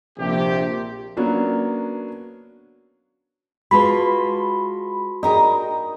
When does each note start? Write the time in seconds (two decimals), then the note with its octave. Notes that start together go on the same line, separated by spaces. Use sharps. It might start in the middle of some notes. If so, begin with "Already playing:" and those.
0.18 A#1 C3 G4
1.17 F#3 A#3 B3 C#4 D4
3.71 G#3 F4 F#4 B4 A5 B5 C6
5.23 D#4 G4 G#4 A#4